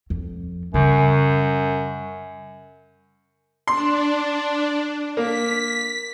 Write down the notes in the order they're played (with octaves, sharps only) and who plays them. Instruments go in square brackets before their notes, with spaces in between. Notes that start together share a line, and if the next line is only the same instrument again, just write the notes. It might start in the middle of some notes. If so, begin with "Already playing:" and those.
[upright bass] F2
[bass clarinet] F#2 [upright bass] C#3 G3
[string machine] D4 [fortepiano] C6
[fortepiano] A#3 [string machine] B6